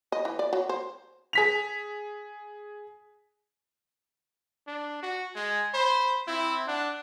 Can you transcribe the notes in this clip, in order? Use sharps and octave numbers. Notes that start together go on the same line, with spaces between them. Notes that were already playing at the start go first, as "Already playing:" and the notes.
D#5
E3
D5
F#3
C5
G#4 B6 F7
D4
F#4
G#3 G#5
C5 B5
C4 E4
D4 F#5